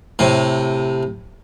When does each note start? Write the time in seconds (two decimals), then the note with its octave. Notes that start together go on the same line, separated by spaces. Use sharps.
0.19 A2 C3